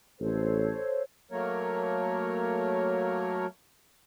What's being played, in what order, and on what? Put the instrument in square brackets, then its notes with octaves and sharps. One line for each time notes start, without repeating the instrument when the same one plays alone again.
[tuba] A1 [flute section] A4 C5 C#5
[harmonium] F#3 A3 A#3 A#4 C#5